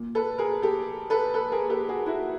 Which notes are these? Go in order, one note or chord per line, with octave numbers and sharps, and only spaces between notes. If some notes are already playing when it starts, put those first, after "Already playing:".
Already playing: A#2
A4 B4
G#4 A#4
G4 A4
A4 B4
A4 B4
G#4 A#4
G4 A4
F#4 G#4
E4 F#4